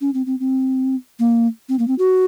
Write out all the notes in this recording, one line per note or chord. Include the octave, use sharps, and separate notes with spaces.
C#4
C4
C4
C4
A#3
C4
A#3
C4
F#4